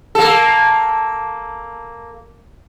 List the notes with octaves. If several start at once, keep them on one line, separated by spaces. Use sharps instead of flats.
A#3 A4